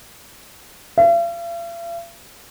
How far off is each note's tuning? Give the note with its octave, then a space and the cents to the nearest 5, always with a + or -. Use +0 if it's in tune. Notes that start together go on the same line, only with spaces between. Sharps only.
F5 -45